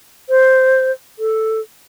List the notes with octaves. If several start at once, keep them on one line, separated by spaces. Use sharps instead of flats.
C5
A4